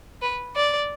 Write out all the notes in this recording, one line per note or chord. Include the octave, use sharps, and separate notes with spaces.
B4
D5